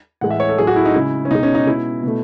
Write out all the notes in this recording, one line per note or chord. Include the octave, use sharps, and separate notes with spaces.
A2 E3 G#3 F#5
E5
C#5
A4
A2 F#3 A3 G#4
F#4
E4
D#4
C#3 G#3 E4
C#4
B2 G#3 D#4
C#4
D#4
B2 G#3 E4
B2 A3